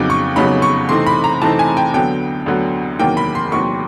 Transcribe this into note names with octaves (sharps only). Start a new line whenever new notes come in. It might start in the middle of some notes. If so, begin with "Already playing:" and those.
Already playing: F2 C#3 F#3 B3 D#4 D6
C#6
F2 C#3 F#3 B3 D#4 B5
C#6
C3 E3 A3 C4 D#4 C6
B5
A#5
C3 E3 A3 C4 D#4 A5
G#5
G5
D2 D3 F#3 B3 G5
D2 D3 F#3 B3
E2 C3 D#3 F#3 A#3 G5
B5
C6
E2 C3 D#3 F#3 A#3 C#6